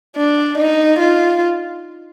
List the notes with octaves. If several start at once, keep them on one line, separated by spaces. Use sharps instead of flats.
D4
D#4
F4